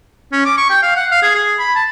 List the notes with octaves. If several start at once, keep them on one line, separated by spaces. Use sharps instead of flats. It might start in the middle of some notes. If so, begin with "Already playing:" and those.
C#4
D6
C#6
G5
F5
F#5
F5
G#4
G#4
B5
A5